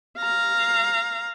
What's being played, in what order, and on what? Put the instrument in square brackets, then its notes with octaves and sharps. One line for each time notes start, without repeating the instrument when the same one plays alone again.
[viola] F5 A#5